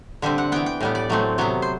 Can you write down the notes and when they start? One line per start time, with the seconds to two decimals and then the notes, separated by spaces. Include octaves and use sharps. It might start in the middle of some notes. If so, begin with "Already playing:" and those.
0.22 D3 G3 C4 E5
0.38 F#5
0.52 E3 B3 G5
0.66 G5
0.81 A2 G3 B3
0.95 D5
1.10 A2 F#3 A3 C4
1.38 C3 F#3 B3
1.62 C5